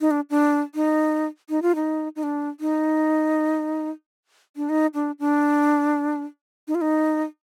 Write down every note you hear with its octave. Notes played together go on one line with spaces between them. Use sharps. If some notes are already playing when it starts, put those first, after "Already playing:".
D#4
D4
D4
D#4
D#4
F4
D#4
D#4
D4
D#4
D4
D#4
D4
D4
D#4
F4
D#4